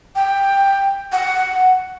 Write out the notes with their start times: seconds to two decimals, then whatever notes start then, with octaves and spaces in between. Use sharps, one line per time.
0.15 G5
1.12 F#5